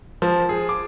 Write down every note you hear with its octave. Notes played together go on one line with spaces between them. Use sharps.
F3
G#4
D6